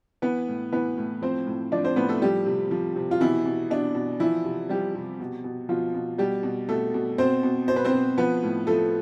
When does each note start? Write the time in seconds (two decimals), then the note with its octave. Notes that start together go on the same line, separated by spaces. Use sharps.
0.22 E3 B3 B4
0.48 A2
0.72 E3 B3 B4
0.98 A2
1.22 F3 C4 C5
1.47 A2
1.72 F3 D4 D5
1.84 C4 C5
1.96 A2 B3 B4
2.09 A3 A4
2.22 F3 G3 G4
2.46 C3
2.71 F3
2.96 C3
3.11 F4
3.21 B2 E3 E4
3.46 B2
3.70 B2 D4
3.95 B2
4.20 E3 F3 E4
4.45 C3
4.69 F3 G3 G4
4.95 C3
5.20 B2
5.44 B2
5.69 B2 F3 F4
5.94 B2
6.18 B2 G3 G4
6.43 B2
6.69 B2 A3 A4
6.94 B2
7.18 B2 C4 C5
7.43 B2
7.68 B2 C5
7.76 B4
7.85 C4 C5
7.93 B2
8.18 F3 B3 B4
8.43 A2
8.67 F3 A3 A4